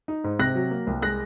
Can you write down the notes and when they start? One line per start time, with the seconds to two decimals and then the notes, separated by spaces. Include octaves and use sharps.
0.08 D#4
0.24 G#2
0.39 C3 F#6 A#6
0.55 F#3
0.71 A#3
0.87 C2
1.02 G#3 F#6 A#6